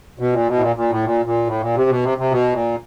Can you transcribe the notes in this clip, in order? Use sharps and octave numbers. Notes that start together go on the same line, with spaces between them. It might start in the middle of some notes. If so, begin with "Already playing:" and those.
B2
A#2
B2
A2
A#2
A#2
A2
A#2
A#2
A2
A#2
C3
B2
C3
C3
B2
A#2